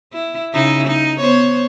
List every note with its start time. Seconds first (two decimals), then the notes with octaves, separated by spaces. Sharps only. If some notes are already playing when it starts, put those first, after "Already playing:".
0.13 E4
0.53 C#3 D#4 E4
0.87 D#4
1.20 B3 C5 C#5